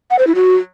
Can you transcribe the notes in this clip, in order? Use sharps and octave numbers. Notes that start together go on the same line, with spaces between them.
F#5
C5
E4
F#4